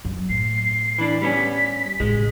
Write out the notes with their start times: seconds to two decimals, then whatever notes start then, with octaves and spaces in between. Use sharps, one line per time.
0.05 F#2
0.29 A2 C7
0.98 E3 D4 B5
1.22 G3 B3 C#4 B6
2.00 A1 C#3 G#3